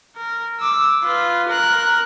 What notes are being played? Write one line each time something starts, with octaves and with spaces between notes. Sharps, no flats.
A#4
D6 E6
F4 B4
A#4 F#6